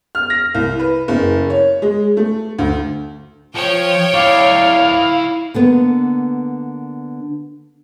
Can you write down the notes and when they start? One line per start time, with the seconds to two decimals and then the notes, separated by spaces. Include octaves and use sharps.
0.15 F6
0.30 A#6
0.54 C2
0.79 B4
1.08 F#1
1.50 C#5
1.82 G#3
2.17 A3
2.58 D2
3.55 F3 C#5 G5
4.14 E4 D5 F5
5.54 D3 A#3 B3